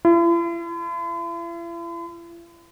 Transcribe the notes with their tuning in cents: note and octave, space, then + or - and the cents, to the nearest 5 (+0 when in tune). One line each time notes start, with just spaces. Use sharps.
E4 +45